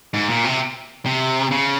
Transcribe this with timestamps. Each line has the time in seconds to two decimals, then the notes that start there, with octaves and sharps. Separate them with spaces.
0.14 G#2
0.29 A#2
0.45 C3
1.06 C3
1.51 C#3